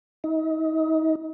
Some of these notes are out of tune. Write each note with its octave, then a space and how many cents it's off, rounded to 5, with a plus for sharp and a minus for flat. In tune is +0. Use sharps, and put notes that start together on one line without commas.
D#4 +35